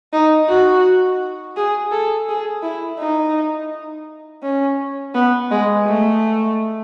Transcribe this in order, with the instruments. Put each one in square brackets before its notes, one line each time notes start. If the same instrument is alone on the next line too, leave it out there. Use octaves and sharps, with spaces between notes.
[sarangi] D#4
F#4
G#4
A4
G#4
E4
D#4
C#4
B3
G#3
A3